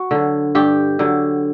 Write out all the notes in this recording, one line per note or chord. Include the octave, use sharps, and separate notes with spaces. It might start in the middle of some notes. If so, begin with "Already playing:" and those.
Already playing: F#4
D3 F#3
G2 G4
D3 F#3